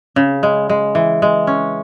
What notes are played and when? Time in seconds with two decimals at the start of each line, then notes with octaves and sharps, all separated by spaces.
0.16 C#3
0.43 G#3
0.69 G#3
0.95 E3
1.22 G#3
1.47 C#4